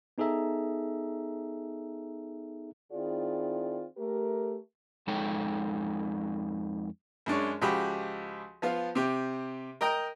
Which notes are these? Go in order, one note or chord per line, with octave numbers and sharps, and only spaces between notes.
B3 D#4 G#4 A4 E5 A#5
D#3 C4 E4 F4 G#4 D5
A3 G4 A#4
F2 G#3 D#4 A4 C#5 G5
F#2 G#3 D4 C#5
C#2 F3 F#4 G4 B5
F3 B3 F4
C3 G4
A#4 D#5 G5 A#5